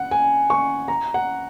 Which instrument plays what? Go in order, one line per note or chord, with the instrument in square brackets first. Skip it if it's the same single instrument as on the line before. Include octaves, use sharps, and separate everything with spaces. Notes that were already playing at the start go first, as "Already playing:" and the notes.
Already playing: [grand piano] F#5
G#5
C#6
A#5
F#5